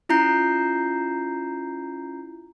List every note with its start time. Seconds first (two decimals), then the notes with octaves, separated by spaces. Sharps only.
0.09 C#4 E4 F4 A#5 G6 C7